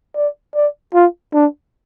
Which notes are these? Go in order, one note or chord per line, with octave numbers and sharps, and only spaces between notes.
D5
D5
F4
D4